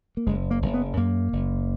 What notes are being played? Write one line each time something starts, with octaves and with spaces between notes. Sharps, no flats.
A#3
F#1 G#3
A#3
F#1
B3
F#2 A#3
F#1